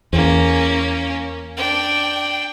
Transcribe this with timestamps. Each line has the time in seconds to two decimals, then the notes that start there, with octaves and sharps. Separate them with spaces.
0.13 E2 A#3 C#4
1.57 D4 G5